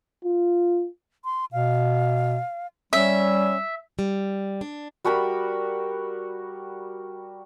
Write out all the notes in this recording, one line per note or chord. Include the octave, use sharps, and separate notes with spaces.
F4
C6
B2 F5
G3 C#4 E5
G3
D4
G3 F#4 A#4 B5